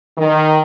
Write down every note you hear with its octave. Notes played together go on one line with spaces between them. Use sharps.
D#3